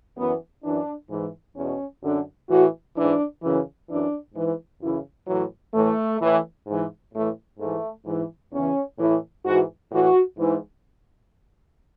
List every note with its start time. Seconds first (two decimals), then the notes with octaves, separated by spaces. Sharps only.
0.17 F#2 E3 B3
0.63 F#2 E3 D4
1.10 G#2 E3
1.56 E2 B2 C#4
2.03 F#2 D3
2.49 A2 E3 F#4
2.95 G#2 E3 D4
3.42 F#2 C#3 E3
3.88 F#2 E3 D4
4.35 G#2 E3
4.81 F#2 C#3 E3 E4
5.27 A2 E3 F#3
5.74 A2 E3 A3
6.21 A2 E3
6.67 G#2 E3
7.13 A2 E3 A3
7.60 G#2 E3 A3
8.06 G#2 E3
8.52 E2 C#3 E3 C#4
8.99 A2 E3
9.45 G#2 E3 F#4
9.91 A2 E3 F#4
10.38 G#2 E3